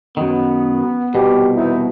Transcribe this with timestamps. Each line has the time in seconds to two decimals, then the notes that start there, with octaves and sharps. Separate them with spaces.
0.17 F#2 D#3 B3
1.15 C2 B2 G4
1.56 E2 C3 D#4 E4